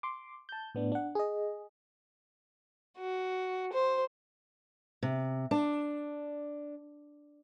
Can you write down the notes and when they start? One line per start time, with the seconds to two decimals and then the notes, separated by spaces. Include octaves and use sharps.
0.03 C6 D6
0.49 A5 G6
0.74 A2 B3 D4
0.92 D4 F#5
1.15 G#4 D#5
2.98 F#4
3.73 C5
5.03 C3
5.51 D4